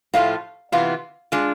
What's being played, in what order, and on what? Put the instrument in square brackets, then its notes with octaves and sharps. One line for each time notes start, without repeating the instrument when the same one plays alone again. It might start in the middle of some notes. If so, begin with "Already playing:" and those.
[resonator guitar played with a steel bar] A2 F3 A3 D4 F4 [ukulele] F5
[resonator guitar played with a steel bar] C3 E3 B3 F4 [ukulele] F5
[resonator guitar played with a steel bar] G#3 D4 F4